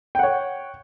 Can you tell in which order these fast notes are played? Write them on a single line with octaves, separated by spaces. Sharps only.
G5 F#5 C#5